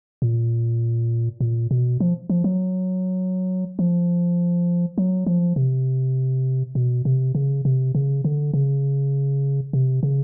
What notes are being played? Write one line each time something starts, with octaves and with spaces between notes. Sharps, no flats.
A#2
A#2
B2
F3
F3
F#3
F3
F#3
F3
C3
B2
C3
C#3
C3
C#3
D3
C#3
C3
C#3